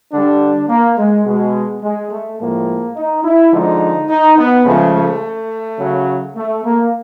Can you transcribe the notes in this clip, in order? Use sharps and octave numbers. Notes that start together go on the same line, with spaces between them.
D3 G3 D4
A#3
G#3
B2 G#3
G#3
A3
A2 F3 G#3 A#3
D#4
E4
D3 F3 G#3 D#4
D#4
B3
C#3 F3 G#3 A3
A3
C#3 F#3
A3
A#3